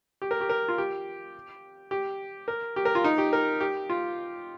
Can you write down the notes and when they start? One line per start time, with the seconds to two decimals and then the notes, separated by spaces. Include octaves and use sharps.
0.22 G4
0.31 A#4
0.41 G4
0.49 A#4
0.68 F4
0.78 G4
1.91 G4
2.48 A#4
2.76 G4
2.85 A#4
2.95 F4
3.04 D#4
3.18 G4
3.33 A#4
3.61 G4
3.90 F4